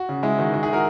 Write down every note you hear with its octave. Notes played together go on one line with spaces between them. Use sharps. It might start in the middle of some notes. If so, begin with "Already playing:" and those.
Already playing: F#4
C#3
G#3 E4
D#3 F#4
D#3 F#4
E4 G#4
F#4 A#4